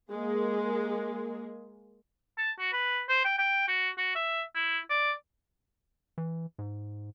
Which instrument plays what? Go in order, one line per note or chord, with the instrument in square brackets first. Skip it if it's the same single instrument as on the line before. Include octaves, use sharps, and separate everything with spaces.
[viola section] G#3 A#3 G#4
[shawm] A5
F#4
B4
C5
G5
G5
F#4
F#4
E5
E4
D5
[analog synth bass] E3
G#2